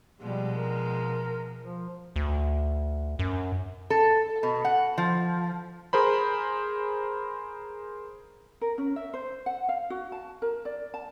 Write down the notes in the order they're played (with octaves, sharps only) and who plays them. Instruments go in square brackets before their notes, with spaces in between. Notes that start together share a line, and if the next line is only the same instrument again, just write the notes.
[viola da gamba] B2 F3 G#3 [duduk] G3
[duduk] A#4
F3
[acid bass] D2
F#2
[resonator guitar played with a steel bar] A4
B2
F#5
F3
[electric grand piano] G#4 A#4 C5 B5
[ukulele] A#4
C#4
E5
C5
F#5
F5
F#4
A5
A#4
D5
A5